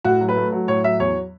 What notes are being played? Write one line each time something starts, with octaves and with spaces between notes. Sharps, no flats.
A2 F#4
F#3
B4
A3
F#3
A2 C#5
F#3 E5
E2 C#5